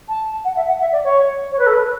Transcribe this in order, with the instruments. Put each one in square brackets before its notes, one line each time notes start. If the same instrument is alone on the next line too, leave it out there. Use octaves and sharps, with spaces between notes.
[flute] A5
F#5
E5
F#5
E5
D5
C#5
C#5
B4
A4
B4